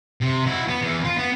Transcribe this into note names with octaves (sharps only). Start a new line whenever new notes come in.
C3
E4 F#4
B3
E2 E3
F4
B3